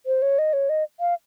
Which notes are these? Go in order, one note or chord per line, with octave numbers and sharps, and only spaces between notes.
C5
C#5
D#5
C#5
D#5
F5